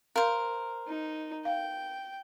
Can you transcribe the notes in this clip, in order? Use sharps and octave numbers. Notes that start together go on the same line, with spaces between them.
A#4 C5 F5
D#4
F5 G5